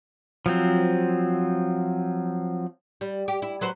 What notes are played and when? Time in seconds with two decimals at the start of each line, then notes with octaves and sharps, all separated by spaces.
0.46 F3 F#3 C4
3.01 G3
3.28 G4
3.42 E4
3.61 F#3 B4 C5